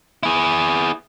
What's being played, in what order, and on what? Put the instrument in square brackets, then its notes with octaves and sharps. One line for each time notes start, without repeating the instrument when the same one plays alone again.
[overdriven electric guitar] E4 G#4